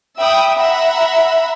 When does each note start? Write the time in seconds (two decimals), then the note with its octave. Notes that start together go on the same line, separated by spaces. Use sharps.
0.19 E5 G5 B5 D#6
0.58 E5 F#5 A#5 B5